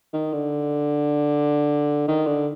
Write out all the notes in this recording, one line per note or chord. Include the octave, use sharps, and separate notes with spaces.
D#3
D3
D#3
D3